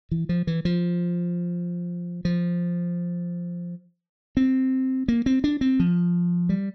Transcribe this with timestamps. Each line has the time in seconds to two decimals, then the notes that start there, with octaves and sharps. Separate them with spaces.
0.11 E3
0.29 F3
0.47 E3
0.65 F3
2.25 F3
4.37 C4
5.08 A#3
5.26 C4
5.44 D4
5.61 C4
5.80 F3
6.49 G3